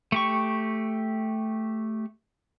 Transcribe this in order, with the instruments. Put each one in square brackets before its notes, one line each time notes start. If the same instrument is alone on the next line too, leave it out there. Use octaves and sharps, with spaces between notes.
[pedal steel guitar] A3 G4 C#6